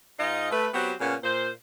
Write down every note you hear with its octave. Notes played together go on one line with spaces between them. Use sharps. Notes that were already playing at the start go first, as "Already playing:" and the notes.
G#2 D#4 F4 D#5
A3 B4
F#3 B3 C4 F#4 G4 C5
A#2 C#3 B3 C#4
A#2 C5